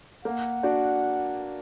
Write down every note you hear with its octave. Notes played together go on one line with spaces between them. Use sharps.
A#3 F#5
D4 F#4